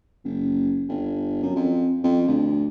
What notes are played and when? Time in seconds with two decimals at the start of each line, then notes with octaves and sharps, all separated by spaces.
0.24 F#1
0.89 G1
1.43 F#2
1.55 F2
2.04 F2
2.28 D2